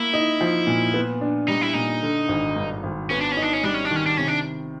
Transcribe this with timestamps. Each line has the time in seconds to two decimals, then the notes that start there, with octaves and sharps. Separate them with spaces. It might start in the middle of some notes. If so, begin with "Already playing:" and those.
Already playing: A#3 E4
0.13 D#4
0.41 F3
0.67 A#2
0.94 B3
1.21 D4
1.48 G3 D#4
1.61 E4
1.74 A#2 D#4
2.02 D3
2.29 G#1
2.56 G2
2.83 G#1
3.10 B3 C#4
3.21 D4
3.32 C#4
3.37 D#4
3.42 D4
3.53 C#4
3.64 G3 D4
3.74 C#4
3.85 D4
3.91 D#3 C#4
4.06 D4
4.17 C3 C#4
4.28 D4